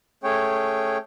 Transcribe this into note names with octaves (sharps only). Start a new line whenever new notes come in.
A3 C#4 G#4 C#5 G5